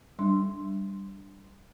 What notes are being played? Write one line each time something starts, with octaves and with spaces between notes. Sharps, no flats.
G3 D4 C6